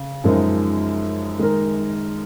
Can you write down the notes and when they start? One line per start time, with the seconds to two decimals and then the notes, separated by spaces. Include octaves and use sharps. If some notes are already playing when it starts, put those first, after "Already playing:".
Already playing: C#3
0.24 F#2 F3 G#3 D#4 A#4
1.39 D#3 G#3 D#4 A#4